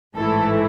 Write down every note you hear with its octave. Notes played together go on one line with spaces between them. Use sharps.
A1 G#2 E3 A3 E4 A4